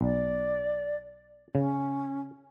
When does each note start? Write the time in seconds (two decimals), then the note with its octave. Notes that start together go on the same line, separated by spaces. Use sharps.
0.01 B1 D5
1.55 C#3 C#4